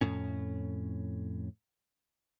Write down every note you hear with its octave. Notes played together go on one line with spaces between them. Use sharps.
F2 A2 C#4